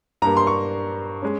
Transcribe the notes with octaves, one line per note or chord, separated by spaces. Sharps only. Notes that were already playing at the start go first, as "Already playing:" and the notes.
G2 G3 A#3 A#5
C6
C#6
G#3 C#4